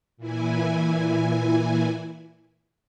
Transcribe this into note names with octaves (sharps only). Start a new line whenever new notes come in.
A#2 E3 E4 G#5